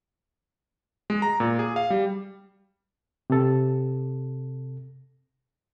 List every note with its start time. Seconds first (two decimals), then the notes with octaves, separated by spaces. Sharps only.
1.10 G#3
1.22 A#5
1.40 A#2
1.59 G#4
1.76 F5
1.90 G3
3.30 C3 A4